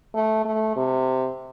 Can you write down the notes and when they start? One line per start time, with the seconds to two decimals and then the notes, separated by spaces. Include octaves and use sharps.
0.15 A3
0.45 A3
0.77 C3